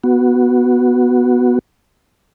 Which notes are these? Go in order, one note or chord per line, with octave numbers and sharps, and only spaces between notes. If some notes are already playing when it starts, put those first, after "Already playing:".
B3 F#4